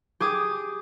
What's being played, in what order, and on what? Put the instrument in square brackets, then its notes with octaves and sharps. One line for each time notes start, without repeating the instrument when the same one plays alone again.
[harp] G4 G#4 D6 D#6